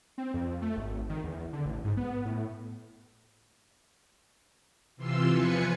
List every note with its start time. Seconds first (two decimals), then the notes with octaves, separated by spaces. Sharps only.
0.18 C4
0.34 F2
0.62 A3
0.77 G#1
1.09 D#3
1.23 E2
1.53 D3
1.66 A1
1.84 G#2
1.97 B3
2.25 A2
4.97 C3 E3 F4 C6 E6
5.32 E2 F3 F4 B4 G#5 C#7